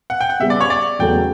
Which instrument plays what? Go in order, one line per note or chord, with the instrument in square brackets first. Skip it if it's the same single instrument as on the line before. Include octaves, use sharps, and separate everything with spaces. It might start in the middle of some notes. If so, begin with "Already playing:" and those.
[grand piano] F#5
G5
F#5
[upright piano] C#3 G3 B3 [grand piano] E5
[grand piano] D5
C#5
D5
[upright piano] E2 C#3 F#3 A3 [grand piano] G5